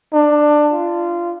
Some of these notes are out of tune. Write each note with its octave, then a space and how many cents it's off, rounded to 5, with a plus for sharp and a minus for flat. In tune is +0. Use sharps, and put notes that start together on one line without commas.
D4 +15
F4 -20